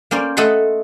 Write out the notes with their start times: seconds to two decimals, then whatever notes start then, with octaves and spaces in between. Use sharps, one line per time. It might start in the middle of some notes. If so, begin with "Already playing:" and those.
0.11 A#3 C#4 C5 D5
0.37 A3 A4 D#5 F#5 B5 C6